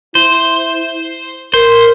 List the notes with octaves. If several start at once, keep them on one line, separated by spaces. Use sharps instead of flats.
E4 C5
A#4 C5